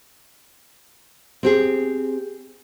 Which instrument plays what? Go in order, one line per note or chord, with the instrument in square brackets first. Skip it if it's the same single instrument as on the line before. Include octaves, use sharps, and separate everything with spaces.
[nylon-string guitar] C4 G4 G#4